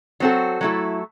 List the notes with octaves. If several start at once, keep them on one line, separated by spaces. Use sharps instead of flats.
F#3 C4 F#4 A4
F#3 A3 E4 A4